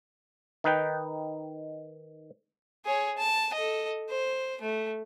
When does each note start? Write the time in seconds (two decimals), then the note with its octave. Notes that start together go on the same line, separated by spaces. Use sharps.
0.64 D#3 D#4 B4 G5
2.85 G#4 C#5
3.17 A5
3.54 A4 D#5
4.10 C5
4.61 A3